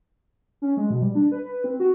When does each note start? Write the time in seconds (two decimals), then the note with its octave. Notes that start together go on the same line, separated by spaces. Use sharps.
0.62 C#4
0.77 G#3
0.90 B2
1.02 G3
1.15 D4
1.32 B4
1.46 B4
1.64 C4
1.80 F#4